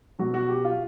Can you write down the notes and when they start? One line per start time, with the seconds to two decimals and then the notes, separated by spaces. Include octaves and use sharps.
0.19 B2 F#3 F#4
0.34 F#4
0.49 G4
0.64 F4